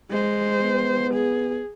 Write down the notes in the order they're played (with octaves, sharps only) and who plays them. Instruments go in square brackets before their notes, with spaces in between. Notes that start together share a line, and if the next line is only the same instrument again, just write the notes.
[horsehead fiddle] G#3 C5
[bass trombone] B3
[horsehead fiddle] G#4